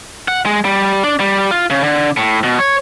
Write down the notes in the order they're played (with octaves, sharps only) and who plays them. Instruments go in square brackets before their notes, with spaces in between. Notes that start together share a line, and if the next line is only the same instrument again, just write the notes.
[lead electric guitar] F#5
G#3
G3
D4
G3
F4
C#3
D3
A2
B2
C#5